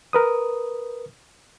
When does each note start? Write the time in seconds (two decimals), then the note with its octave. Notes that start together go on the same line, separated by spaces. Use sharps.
0.13 A#4 B4 D#6